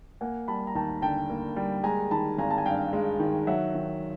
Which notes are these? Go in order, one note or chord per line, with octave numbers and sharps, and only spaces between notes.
A#3 F#5 G#5
G3 A5 B5
A#5
D#2 G5 A5
D3 G5 A5
A#3
G3
G#3 G#5 A#5
D#3 A5 B5
G#1 G#5 A#5
A5
G#5
G2 F5 G5
G#3
D#3
F#3 E5 F#5
D#3